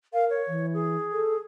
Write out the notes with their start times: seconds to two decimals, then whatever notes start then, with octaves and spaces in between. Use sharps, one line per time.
0.13 A#4 F5
0.30 C#5
0.47 E3
0.73 G#4
1.12 A4